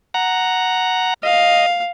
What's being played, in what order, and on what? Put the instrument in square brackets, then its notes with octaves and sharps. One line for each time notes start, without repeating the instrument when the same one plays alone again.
[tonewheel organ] F#5 A#5
[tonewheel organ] D#5 [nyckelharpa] F5